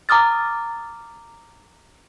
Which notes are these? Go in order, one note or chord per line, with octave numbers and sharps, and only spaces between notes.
A#5 D6 D#6 F6 A6